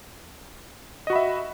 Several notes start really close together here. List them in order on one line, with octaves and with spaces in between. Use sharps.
D#5 F#4 B5 E5